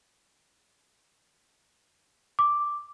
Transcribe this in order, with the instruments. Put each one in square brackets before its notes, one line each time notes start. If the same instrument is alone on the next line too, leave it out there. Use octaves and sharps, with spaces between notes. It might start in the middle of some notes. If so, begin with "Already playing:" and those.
[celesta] D6